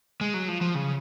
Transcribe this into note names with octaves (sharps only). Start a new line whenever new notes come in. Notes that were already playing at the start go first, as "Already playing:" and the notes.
G#3
F#3
F3
F3
C#3